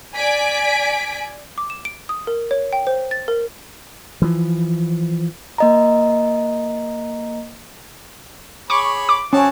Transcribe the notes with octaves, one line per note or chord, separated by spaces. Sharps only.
D5 G#5 B6 D7
D6
E7
D7
D#6
A#4
C#5
G5
C5
A6
A#4
E3 F3
A#3 D#5 A#5
G#4 C#5 B5 C#6 D6
D6
C4 C#4 F#4 A5